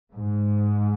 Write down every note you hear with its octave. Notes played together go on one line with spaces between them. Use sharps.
G#2